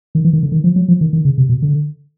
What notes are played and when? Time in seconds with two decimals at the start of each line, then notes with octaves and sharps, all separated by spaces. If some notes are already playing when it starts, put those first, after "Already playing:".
0.15 D#3
0.24 E3
0.33 D#3
0.43 D3
0.52 D#3
0.64 F3
0.76 F#3
0.88 F3
1.01 D#3
1.13 D#3
1.25 C#3
1.38 C3
1.49 B2
1.62 D3